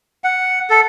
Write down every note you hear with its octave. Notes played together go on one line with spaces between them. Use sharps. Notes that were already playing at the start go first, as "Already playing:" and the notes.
F#5
A4